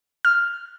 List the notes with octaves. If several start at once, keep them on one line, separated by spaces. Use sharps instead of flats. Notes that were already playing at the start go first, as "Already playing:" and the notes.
F6